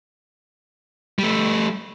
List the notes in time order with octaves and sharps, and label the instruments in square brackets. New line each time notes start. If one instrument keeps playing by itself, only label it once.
[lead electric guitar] G3 A3